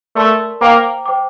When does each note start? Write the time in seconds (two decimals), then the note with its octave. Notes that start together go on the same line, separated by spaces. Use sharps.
0.15 A3 A#4 D5 A5 C6
0.61 A#3 C5 G5 A#5 D6
1.06 C5 G5 D6